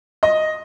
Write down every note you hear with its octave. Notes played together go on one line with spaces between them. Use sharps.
D#5